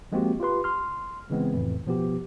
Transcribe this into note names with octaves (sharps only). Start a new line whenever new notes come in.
F3 G#3 A#3 C4 F#4 G4
F4 G4 B4 C6
C6 F6
C#3 E3 G#3 B3 C4
F2 A2 E3
B2 F3 B3 G4